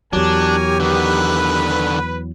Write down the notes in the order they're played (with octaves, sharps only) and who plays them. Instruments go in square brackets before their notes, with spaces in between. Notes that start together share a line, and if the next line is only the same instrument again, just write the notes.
[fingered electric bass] E2 F#3 [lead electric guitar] D4 [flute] G4 [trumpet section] A#4 C#5 G#5
[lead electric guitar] D3 D#3 [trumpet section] B4